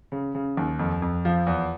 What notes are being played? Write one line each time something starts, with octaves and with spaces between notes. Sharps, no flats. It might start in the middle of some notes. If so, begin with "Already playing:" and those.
C#3
C#3
D#2
F2
F2
F3
E2